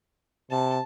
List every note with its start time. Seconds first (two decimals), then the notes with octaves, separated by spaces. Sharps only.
0.51 C3 A5